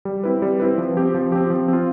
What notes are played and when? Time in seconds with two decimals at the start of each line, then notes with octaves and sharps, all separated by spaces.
0.05 G3
0.24 C4 E4 B4
0.42 G3
0.60 C4 E4 B4
0.78 F3
0.97 C4 G4
1.14 F3
1.32 C4 G4
1.50 F3
1.68 C4 F4